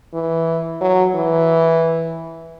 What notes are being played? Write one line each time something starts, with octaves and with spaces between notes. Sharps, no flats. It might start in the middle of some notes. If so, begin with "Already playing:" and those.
E3
F#3
E3